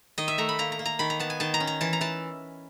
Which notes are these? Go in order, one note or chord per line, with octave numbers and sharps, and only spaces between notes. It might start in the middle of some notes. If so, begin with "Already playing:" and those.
D#3 D#5
E5
A3 A#5
B5
A#3 A#5
A#5
A#3
A#5
D#3 B5
A#5
B3 A5
G#5
D#3 A5
A#5
C#4
A#5
E3 A5
A#5
E3 A5